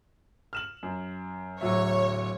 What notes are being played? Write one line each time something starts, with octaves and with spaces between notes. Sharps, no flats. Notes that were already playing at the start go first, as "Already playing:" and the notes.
F6 E7 F#7
F#2
D1 F#3 C#5 E5